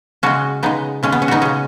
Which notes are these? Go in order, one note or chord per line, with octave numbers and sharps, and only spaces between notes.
C#3 G#3 C#4 F#4
C#3 G#3 B3 D#4
C#3 G#3 C#4
B3
C#4
B3 D#4 F#4
C#3 G#3 C#4